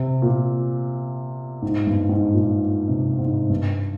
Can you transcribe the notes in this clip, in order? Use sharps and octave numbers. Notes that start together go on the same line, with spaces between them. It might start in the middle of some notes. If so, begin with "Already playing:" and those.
Already playing: C3
A#2
G#2
G2
G#2
A#2
C3
G#2
G2